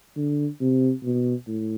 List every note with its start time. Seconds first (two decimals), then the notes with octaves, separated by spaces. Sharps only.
0.17 D3
0.61 C3
1.04 B2
1.47 A2